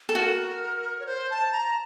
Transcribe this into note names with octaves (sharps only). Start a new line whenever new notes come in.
A4
F#4 A#4
C#5
C5
A5
A#5